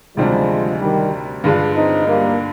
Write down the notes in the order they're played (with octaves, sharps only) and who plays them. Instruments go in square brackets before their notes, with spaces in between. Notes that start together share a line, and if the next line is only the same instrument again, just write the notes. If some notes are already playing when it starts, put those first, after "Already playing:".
[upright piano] D2 C3 D#3 G3 D4 [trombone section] F3 G#3
[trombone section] D#3 G3
[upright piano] G2 D3 G#3 D4 F4
[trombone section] C4 D#4
G3 A#3